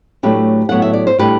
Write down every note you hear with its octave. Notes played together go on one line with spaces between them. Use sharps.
A2 F#3 A3 D4 G4 B4
A2 F#3 B3 F#5
E5
D5
C5
A2 G3 D4 G4 B4